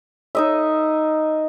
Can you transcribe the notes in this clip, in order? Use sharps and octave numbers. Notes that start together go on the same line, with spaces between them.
D#4 D#5 E5